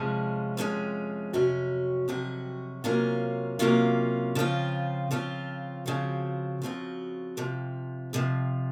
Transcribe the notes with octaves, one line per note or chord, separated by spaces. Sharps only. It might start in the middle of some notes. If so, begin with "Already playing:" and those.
Already playing: F2 C3 F3 G#3 C#4
F2 C3 F3 G#3 C#4
F2 C3 F#3 C#4 F#4
F2 C3 F#3 C#4 F#4
C3 F#3 A#3 C#4 F4
C3 F#3 A#3 C#4 F4
C#3 F3 C4 F4
C#3 F3 C4 F4
C#3 F3 C4 F#4
C#3 F3 C4 F#4
F2 C3 F3
F2 C3 F3